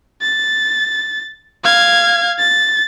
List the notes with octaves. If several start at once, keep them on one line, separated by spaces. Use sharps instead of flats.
A6
F5 G#6
A6